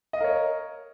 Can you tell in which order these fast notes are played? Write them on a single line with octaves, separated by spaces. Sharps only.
D#5 F5 A#4 C#5